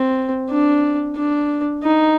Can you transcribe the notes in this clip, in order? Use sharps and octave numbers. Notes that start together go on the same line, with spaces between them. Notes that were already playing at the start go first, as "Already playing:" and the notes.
Already playing: C4
D4
D4
D#4